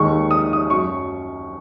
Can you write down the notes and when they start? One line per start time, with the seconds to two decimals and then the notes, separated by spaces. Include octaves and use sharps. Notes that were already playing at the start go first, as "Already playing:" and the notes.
Already playing: D#2 D#3 G#3 C#6
0.31 D#6
0.53 D#6
0.70 F#2 F#3 C#6